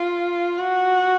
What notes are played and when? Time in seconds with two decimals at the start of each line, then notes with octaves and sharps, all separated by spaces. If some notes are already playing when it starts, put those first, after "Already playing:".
Already playing: F4
0.59 F#4